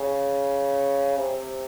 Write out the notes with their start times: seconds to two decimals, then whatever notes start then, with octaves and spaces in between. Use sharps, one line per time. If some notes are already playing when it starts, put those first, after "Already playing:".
Already playing: C#3
1.17 C3